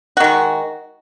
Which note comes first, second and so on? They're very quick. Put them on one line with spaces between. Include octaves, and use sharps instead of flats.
F#4 D#3 G#3